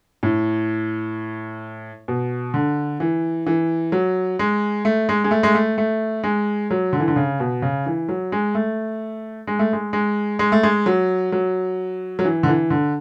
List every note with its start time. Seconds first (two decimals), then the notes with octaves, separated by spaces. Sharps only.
0.23 A2
2.08 B2
2.54 D3
3.00 E3
3.46 E3
3.92 F#3
4.39 G#3
4.85 A3
5.09 G#3
5.24 G#3
5.31 A3
5.43 G#3
5.55 A3
5.78 A3
6.24 G#3
6.71 F#3
6.93 D3
7.00 E3
7.08 D3
7.16 C#3
7.40 B2
7.62 C#3
7.86 E3
8.09 F#3
8.32 G#3
8.55 A3
9.47 G#3
9.59 A3
9.73 G#3
9.93 G#3
10.39 G#3
10.52 A3
10.63 G#3
10.86 F#3
11.32 F#3
12.19 F#3
12.25 E3
12.43 D3
12.48 E3
12.70 D3